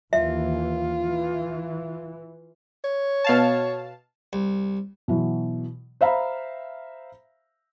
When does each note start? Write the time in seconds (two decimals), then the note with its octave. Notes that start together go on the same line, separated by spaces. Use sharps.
0.13 D#2 E3 F4 E5
1.02 E3
2.84 C#5
3.24 B2 F5 A5
4.33 C2
5.08 B2 E3 F#3
6.01 C5 E5 F5 A#5 B5